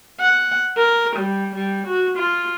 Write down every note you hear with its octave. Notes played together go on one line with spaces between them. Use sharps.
F#5
A#4
G3
G3
F#4
F4